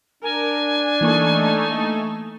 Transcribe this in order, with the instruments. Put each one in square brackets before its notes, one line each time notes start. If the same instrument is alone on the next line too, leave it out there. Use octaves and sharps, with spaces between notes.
[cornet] D4 [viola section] A#4 [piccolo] G#5
[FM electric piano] E3 A#3 C#6 [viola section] A3 D#4 A4